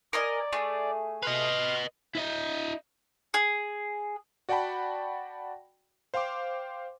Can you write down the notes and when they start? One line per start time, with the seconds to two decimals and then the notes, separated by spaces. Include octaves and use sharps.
0.13 A#4 D5 D#5 G#5
0.53 A3 G#4
1.23 B4 D#5 C6 F6
2.15 E4 D#5
3.34 G#4
4.49 F#4 D5 F#5 G5 A5 B5
6.14 C5 F5 G5 C6 D6